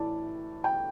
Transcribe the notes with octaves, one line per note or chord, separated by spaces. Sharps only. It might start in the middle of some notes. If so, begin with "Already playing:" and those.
Already playing: A2 E3 D5 A5
G5